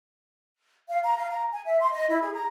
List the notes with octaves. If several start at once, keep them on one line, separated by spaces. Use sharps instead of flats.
F5
A#5
F5
A#5
G#5
E5
C6
D#5
E4
G#4
A#5